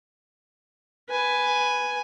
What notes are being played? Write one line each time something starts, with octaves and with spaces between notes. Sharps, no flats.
B4 G#5